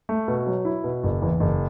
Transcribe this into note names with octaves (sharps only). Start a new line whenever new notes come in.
A3
B2
F#3
E4
B2
F#1
E2
F#1